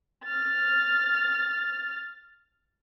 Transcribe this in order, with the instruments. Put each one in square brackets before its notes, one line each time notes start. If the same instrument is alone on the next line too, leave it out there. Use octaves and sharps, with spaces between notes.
[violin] F6 A6